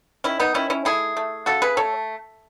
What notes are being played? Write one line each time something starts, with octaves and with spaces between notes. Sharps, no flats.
D#3 C#4 E4
B3 D#4
D#3 C#4 E4
C#4 E4
A3 E4 G#4
A3
C#3 F#4 A4
G#4 B4
A3 A4 C#5